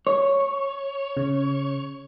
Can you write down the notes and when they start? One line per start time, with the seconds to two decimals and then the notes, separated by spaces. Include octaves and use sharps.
0.07 C#5
1.17 C#3